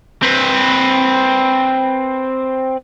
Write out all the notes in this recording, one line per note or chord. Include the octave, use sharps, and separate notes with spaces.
C4 B4